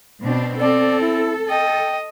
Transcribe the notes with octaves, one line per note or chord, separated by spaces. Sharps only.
B2 C4 D4
C4 A4 D5
E4
D#5 G5